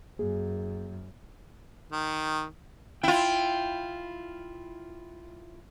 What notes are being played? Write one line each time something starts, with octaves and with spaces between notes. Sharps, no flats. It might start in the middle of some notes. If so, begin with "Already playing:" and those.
F#2 A#3 G#4
D#3
E4 F4 G5